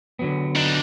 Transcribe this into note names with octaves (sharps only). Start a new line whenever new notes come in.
D3 F#3 B3
D4 D#4